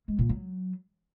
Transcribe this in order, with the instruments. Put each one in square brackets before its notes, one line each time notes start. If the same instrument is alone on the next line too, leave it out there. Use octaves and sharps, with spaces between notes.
[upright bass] G#3
A#2
F#3